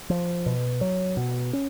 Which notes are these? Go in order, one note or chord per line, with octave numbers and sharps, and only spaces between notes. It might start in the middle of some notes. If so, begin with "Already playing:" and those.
F3
B2
F#3
B2
C#4